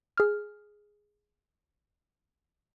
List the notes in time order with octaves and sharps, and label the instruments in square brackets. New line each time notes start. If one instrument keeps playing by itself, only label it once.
[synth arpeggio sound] G#4 F6